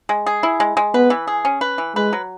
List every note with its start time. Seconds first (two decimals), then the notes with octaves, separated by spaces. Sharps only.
0.09 G#3
0.26 G#4
0.43 E4
0.60 G#3
0.77 G#3
0.94 B3 B4
1.10 E3
1.27 G#4
1.45 C#4
1.61 B4
1.78 E3
1.95 G#3 B4
2.13 F#3